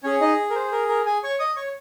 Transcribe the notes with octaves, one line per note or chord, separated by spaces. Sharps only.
C#4 G#4 C#5
D#4 D#5
A#4
C5
A#4
A#4
G#4 G#5
C#5 C#6
D#5 D#6
C#5 C#6